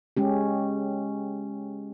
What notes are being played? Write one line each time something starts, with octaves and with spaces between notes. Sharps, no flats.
G#3 C#4 G4